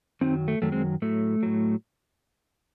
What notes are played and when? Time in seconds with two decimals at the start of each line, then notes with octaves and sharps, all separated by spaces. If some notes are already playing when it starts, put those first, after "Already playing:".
0.21 F#2 D#3 F#3 C4 D#4
0.48 A3
0.62 F#2 D#3 F#3 A3
0.72 G#3 C4
1.02 A2 F#3 A3
1.43 A2 F#3